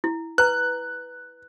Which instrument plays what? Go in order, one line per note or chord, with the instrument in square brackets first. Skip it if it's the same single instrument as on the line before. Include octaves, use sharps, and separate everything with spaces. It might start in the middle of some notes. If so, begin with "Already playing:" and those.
[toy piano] E4
[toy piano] B4 A#5 [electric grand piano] F#6